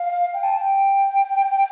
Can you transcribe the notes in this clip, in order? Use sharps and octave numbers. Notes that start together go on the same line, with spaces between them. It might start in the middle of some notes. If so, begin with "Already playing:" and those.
Already playing: F5
G5
A5
G5